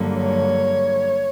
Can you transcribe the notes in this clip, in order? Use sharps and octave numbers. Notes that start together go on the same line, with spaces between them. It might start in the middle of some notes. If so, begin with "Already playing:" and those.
Already playing: G2 D3 F#3 A#3
C#5